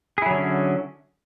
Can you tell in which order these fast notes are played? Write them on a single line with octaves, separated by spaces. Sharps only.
G#4 E4 F#3 D3 C#4